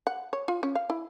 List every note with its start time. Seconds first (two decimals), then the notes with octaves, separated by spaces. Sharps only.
0.07 F#5
0.33 C#5
0.48 F4
0.63 C#4
0.75 F5
0.90 E4